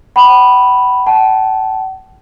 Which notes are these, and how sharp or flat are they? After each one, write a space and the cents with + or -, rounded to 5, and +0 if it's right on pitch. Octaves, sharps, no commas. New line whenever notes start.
F#5 +45 B5 +0
F#5 +45 A5 -20